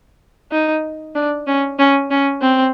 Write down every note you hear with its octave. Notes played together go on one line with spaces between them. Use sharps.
D#4
D4
C#4
C#4
C#4
C4